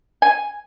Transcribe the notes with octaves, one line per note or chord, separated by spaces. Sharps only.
G#5